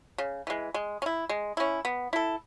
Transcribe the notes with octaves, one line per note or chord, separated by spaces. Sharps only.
C#3
E3 G#3
G#3
C#4
E4
G#3
C#4 E4
B3
E4 A4